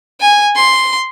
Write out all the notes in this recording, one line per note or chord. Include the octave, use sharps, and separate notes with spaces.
G#5
C6